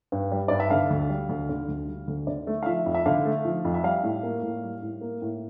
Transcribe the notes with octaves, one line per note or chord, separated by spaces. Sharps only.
G2
G3
G2 D5
E5
D3 F5
D2
G3
D2
D3
D2
G3
D2
D3 D5
A3
F5
F3 E5
F2
E5
D3 F5
A3
F3
F2
E5
G3 F5
A2
A#3
A2
G3
A2
A#3
A2